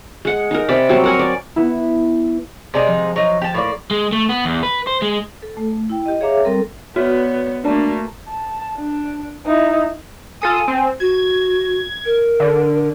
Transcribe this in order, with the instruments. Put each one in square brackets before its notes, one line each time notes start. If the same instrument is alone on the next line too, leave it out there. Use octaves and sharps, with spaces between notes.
[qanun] G#3 F#5
D#4 A#4
C3 D5 B5
F#3 G3 C4
A#4 F#5 G#5
D5
[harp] B3 E4
[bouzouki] C3 G#3 D#4 [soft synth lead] D5
[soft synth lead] F3
[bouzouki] F#3 D#4
G4 A5
A2 A#3 D5
[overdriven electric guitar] G#3
A3
B3
E2
B4
C5
G#3
[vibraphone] A4
A3
E4 G5
G4 D#5
G#4 C#5 E5 F5 A#5 D6
G3 C4 A4 A#4
[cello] B3 [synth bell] F#4 [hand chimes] C#5 D5
[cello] A3 A#3 [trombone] D4 [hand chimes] B4 A5 A#5
[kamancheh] A5
D4
D#4 E4
[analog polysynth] F4 A4 D#6 [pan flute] G#5
[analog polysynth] C4
[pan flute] F#4 [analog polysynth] G#6
[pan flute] A#4
[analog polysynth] D3